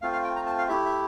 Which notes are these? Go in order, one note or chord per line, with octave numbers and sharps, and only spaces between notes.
A3 C4 F4 F5
F5
G5
A#5
A5
F5
A3 E4 G4 E5
E5